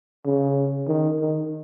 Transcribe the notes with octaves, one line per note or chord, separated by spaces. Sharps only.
C#3
D#3
D#3